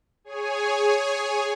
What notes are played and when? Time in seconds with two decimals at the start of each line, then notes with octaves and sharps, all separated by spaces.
0.24 G#4 C#5 G#5